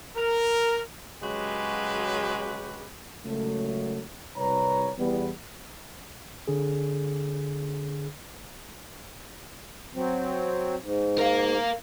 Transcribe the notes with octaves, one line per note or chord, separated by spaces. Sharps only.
A#4
C#3 F#3 G#3 F#4 G4 B4
C#2 A#2 F#3 A3
C2 B4 C#5 A#5
E2 G3 B3
D3 G#4
F#3 C4
G#2
A#4 F5